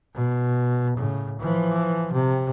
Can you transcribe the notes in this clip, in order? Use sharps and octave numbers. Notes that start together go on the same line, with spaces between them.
B2
A2 C#3
E3 F3
C3